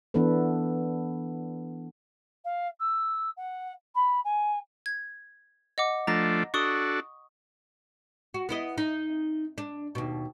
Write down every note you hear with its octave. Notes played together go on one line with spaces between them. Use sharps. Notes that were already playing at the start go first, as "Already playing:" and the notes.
E3 B3 D4 A4 B4
F5
E6
F#5
B5
G#5
G#6
D#5 F#5 D6
F3 A3 D4 A#5 A#6
D4 F#4 A4 C#6 D#6 G7
F#4
B3 E4 D#5
D#4
D4
D#2 B2